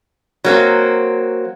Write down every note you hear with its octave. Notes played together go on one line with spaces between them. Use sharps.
F#3 A#3 C4